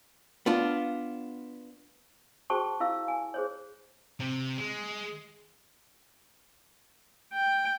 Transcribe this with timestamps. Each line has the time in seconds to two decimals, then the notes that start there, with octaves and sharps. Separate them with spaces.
0.46 B3 D4 F4
2.50 F#4 G#4 C5 G5 A5 C#6
2.80 E4 F5 E6
3.08 G#5
3.34 G#4 C5 C#5
4.20 C3
4.57 G#3
7.34 G5